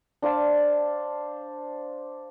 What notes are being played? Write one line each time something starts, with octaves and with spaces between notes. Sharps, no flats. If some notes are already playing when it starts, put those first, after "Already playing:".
D4 C5 F5 A5